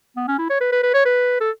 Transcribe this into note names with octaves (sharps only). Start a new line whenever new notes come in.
B3
C#4
E4
C#5
B4
B4
B4
C#5
B4
A4